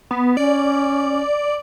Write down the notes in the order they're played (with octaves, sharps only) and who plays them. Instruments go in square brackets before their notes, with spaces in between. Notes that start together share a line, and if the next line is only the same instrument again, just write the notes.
[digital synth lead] B3
[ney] C#4 [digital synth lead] D5